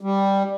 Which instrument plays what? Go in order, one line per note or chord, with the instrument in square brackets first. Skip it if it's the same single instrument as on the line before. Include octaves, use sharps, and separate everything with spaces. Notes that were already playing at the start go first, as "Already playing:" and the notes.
[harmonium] G3